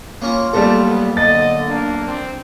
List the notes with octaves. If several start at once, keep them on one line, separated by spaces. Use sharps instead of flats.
A#3 C#4 F4 A#5
B1 A#2 G3 A3 A4 A5 A#5
B3
D3 D#5 A6
A#3 D4
C4